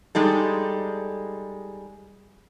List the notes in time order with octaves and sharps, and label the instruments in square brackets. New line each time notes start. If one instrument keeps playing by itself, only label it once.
[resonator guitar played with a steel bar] G3 G#3 D#4 A4